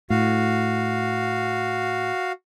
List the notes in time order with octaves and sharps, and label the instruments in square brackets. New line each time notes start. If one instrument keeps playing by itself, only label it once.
[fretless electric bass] A2 [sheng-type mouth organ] F#4 F5